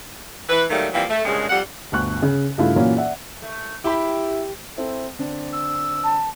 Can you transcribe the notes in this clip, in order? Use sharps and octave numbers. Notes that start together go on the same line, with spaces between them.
E3 B4
D#3 F#3 G3 A3 A#3
E3 F3 G3 A#3 C4
A3
G2 A#2 C#3 G#3
F2 G3 F#5
G1 D2 C#6 F#6
C#3
G2 C#3 A3 E4 F4
A#2 E3 F#3 A#3 C#4 F4
D5 E5 F#5
A3
E4 G4 B5
C4 E4 A4
D3 C4 D4
E6
A5